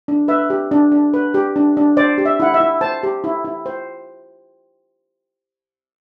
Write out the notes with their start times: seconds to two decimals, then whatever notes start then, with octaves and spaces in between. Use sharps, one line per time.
0.08 D4
0.28 B4 E5
0.50 G4
0.71 D4
0.92 D4
1.14 B4
1.34 G4
1.56 D4
1.77 D4
1.97 C5 D5
2.18 G4
2.25 E5
2.40 E4 F#5
2.54 E5
2.60 E4
2.81 C5 A5
3.03 G4
3.24 E4
3.45 E4
3.66 C5